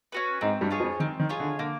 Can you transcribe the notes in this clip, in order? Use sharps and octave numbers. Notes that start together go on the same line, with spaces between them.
C#4 F#4 B4
G#2 G#3 C4
G2 G3
F4 G#4 C#5
F2 F3
D#3 C4
D#3
F4 G#4 C#5
D3
D3 A#3